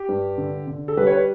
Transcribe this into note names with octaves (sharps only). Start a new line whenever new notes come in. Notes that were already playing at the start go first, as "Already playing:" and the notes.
Already playing: G4
G2
D3
D3
A4
G3 B4
C#5
B4